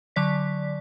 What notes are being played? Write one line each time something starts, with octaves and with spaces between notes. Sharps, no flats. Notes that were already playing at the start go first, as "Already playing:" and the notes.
D3 F#3 D5 B6